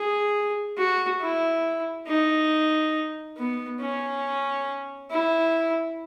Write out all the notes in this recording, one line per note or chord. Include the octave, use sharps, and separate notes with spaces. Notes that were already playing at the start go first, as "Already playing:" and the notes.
Already playing: G#4
F#4
E4
D#4
B3
C#4
E4